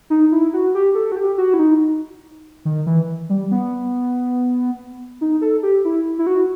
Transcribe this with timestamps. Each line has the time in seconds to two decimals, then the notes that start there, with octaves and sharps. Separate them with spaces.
0.10 D#4
0.32 E4
0.53 F#4
0.75 G4
0.95 A4
1.12 F#4
1.16 G4
1.38 F#4
1.54 E4
1.59 D#4
2.65 D#3
2.86 E3
3.30 G3
3.51 B3
5.21 D#4
5.41 A4
5.63 G4
5.85 E4
6.19 E4
6.27 F#4